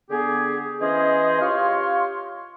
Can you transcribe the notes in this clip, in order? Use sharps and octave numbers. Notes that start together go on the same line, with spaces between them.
D3 B3 G4 G#4
E3 C#4 G#4 C5 D#5
F4 G4 C#5 F5 C6